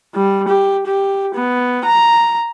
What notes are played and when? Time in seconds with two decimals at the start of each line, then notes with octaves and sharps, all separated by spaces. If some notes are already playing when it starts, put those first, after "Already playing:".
0.15 G3
0.48 G4
0.87 G4
1.35 B3
1.85 A#5